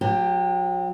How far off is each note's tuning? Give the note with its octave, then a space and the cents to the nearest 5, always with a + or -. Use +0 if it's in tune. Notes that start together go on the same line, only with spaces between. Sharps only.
F#3 -35 G4 +15